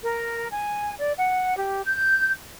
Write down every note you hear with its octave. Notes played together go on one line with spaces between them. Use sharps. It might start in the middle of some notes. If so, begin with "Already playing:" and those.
A#4
G#5
D5
F#5
G4
G6